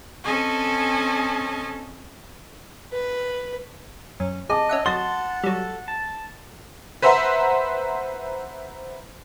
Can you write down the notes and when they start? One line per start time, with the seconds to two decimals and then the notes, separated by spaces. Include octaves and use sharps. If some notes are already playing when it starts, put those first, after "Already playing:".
0.24 C4 C#4 A4 D#5 G#5 A5
2.92 B4
4.20 F#2 C#4
4.50 G#4 D#5 A5 D6
4.69 C#4 E5 F#5
4.86 F#3 D#5 F#5 A5 C6 A6
5.44 F#3 G3 A4
5.88 A5
7.02 B4 C5 E5 F#5 A#5 C6